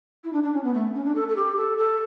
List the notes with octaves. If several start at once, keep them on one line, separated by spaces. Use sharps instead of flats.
E4
D4
D4
C#4
B3
A3
C#4
D4
A4
A4
G4
A4
A4